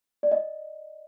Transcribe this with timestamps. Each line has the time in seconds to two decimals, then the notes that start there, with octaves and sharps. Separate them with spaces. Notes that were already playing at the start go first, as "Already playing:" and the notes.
0.23 D5
0.32 D#5